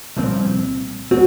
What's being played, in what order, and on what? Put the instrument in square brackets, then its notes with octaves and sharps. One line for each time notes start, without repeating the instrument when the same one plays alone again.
[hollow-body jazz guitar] C2 A#2 F3 C4
[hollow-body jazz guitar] C4 [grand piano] F#4